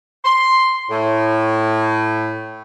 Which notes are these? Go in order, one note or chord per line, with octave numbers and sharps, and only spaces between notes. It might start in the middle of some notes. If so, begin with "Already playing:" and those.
C6
A2